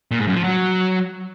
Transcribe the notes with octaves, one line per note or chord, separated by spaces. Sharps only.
A#2
G#2
F#2
F3
F#3